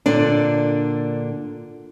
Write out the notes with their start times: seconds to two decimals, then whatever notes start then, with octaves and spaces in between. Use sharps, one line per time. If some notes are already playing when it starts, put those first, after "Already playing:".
0.06 A#2 D3 D4